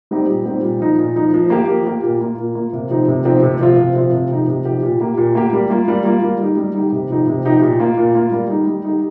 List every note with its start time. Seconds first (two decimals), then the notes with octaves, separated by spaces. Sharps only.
0.11 G3 C4 D#4 G4
0.28 A#2
0.46 G3 C4 D#4 G4
0.63 A#2
0.80 F3 D#4
0.98 A#2
1.16 F3 D#4
1.34 F3
1.50 A#3 G4
1.68 F3
1.86 A#3 G4
2.03 A#2
2.21 A#3 F4
2.38 A#2
2.55 A#3 F4
2.73 C3
2.90 F3 C4 D#4 G4
3.08 C3
3.25 F3 C4 D#4 G4
3.43 C3
3.60 F3 C4 F4
3.77 C3
3.95 F3 C4 F4
4.12 C3
4.31 F3 D#4 G4
4.48 C3
4.65 F3 D#4 G4
4.83 A#2
5.00 A#3 G4
5.18 A#2
5.35 A#3 G4
5.53 G3
5.70 A#3 F4
5.88 G3
6.05 A#3 F4
6.22 G3
6.40 D#4 G4
6.57 G3
6.74 D#4 G4
6.92 C3
7.10 F3 D#4 G4
7.27 C3
7.45 F3 D#4 G4
7.62 A#2
7.80 A#3 F4
7.97 A#2
8.15 A#3 F4
8.32 G3
8.50 D#4 G4
8.67 G3
8.85 D#4 G4